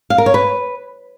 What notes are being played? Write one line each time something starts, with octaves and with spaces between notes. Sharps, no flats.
F5
A#4
C#5
B4